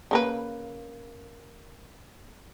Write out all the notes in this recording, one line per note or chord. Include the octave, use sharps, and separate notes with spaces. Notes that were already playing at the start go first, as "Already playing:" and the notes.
C#3 A#3 B4